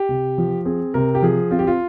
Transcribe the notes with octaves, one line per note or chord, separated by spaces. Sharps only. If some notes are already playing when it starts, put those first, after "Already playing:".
Already playing: G4
C3
F3
C4 G#4
C3 A#4
G4
F3 G#4
C4 F4
G4
F4